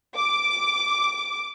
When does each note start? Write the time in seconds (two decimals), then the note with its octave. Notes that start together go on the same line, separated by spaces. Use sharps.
0.15 D6